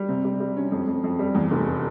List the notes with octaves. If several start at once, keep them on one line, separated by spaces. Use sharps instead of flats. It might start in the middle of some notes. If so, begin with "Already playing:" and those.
Already playing: G3
C3
G3
G3
C#4
F2
F2
F2
G3
E2
F1